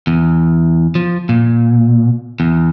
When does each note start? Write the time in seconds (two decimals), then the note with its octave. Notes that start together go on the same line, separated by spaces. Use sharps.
0.07 E2
0.95 F3
1.29 A#2
2.40 E2